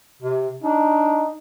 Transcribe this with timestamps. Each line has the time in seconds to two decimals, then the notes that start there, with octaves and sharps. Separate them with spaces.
0.22 C3
0.63 D4 D#4